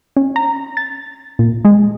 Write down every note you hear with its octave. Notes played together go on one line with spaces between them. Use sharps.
C#4
A#5
A6
A#2
G#3